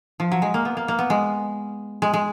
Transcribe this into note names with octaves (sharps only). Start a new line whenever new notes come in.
F3
F#3
G#3
A#3
B3
A#3
A#3
B3
G#3
G#3
G#3